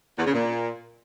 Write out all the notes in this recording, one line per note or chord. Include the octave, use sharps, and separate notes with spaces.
E2
C#3
A#2